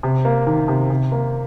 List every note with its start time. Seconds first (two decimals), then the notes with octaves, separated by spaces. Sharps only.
0.03 C3
0.25 A#3
0.47 D#3
0.68 C3
0.90 C3
1.12 A#3